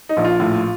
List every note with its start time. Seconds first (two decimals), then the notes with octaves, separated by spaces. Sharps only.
0.09 D#4
0.17 A#1
0.24 F4
0.40 A2